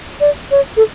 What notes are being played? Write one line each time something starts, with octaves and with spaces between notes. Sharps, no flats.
D5
C#5
A4